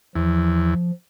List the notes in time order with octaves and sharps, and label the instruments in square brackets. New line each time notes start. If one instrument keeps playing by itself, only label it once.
[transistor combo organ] E2 [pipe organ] F3